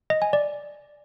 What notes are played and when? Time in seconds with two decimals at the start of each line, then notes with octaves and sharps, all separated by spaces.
0.10 D#5
0.22 G#5
0.33 D5